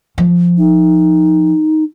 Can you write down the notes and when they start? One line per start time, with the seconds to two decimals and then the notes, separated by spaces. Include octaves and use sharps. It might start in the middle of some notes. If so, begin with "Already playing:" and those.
0.18 F3
0.58 D#4